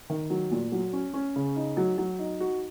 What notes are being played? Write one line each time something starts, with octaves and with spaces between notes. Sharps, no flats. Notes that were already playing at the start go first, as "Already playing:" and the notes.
D#3
F#3
A#2
F#3
C#4
C#4
C#3
D#4
F#3
F#3
D#4
F#4